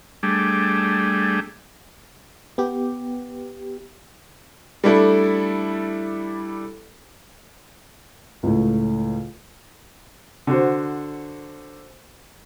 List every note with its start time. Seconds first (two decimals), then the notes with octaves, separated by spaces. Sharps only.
0.23 G3 A3 D4 G#4
2.58 B3 G4
4.84 G3 A3 D4 E4 A4
8.43 C#2 A2
10.47 D3 F#4 C5